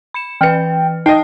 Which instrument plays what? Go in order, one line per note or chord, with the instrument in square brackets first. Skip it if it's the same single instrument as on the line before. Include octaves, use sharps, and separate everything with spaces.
[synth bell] B5 C#7 E7
[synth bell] E3 B4 [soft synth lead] G5 [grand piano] F6 C#7
[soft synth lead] D#4 [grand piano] D#5 G5 [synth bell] A5 C7